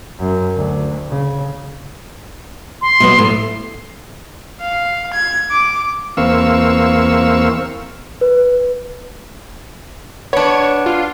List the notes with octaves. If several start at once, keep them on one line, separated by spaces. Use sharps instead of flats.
F#2
D2
C#3
C6
B2 F#3 B3
A2
F5
G#6
D6
E2 A#3 C4 F5 C#6 E6
B4
B3 D4 C#5
F4